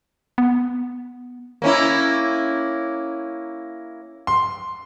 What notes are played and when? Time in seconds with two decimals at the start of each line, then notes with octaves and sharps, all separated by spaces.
0.38 B3
1.62 A#3 C#4 E4
4.27 C6